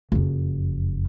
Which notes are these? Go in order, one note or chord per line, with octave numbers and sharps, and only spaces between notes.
F#1 F2